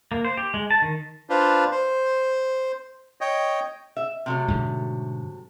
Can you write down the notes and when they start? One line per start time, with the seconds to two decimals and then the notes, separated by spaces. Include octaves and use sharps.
0.12 A#3
0.25 C5
0.37 G4
0.54 G#3
0.71 A5
0.82 D#3
1.30 D4 F4 B4 C5
1.72 C5
3.21 C#5 D#5 G5
3.97 E5
4.26 C3 F#3 A3
4.48 G#2 B2 D3